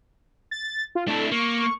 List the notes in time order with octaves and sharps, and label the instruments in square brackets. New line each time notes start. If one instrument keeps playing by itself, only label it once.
[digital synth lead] A6
F4
[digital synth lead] A3 [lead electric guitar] D4 E4
[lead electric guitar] A#3 [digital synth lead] C#6